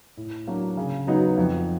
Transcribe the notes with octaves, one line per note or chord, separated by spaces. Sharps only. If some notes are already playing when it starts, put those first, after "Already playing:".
A2
F#3 A#3 D4 F#4
C#3
F#3 B3 D#4 F#4
F2